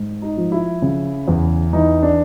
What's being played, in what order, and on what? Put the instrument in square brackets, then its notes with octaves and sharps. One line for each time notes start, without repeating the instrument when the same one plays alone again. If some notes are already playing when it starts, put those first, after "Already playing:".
Already playing: [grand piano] G#2
D#4
F3
E4
C#3
E2
E3 D#4
D4